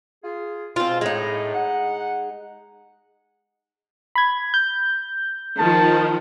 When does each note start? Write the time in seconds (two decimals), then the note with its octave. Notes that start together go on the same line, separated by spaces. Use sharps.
0.23 F4 G#4
0.76 G#2 B2 C4 F4
1.01 A2 G#3 D#4
1.54 F#5
4.16 B5 G#6
4.54 G6
5.59 D#3 F3 A5